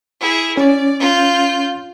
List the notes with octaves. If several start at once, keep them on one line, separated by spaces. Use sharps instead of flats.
E4 G#4
C#4 D5
F4 G6